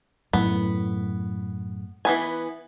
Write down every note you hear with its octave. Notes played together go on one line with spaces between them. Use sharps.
F#2 A2 B3
E3 B3 G#5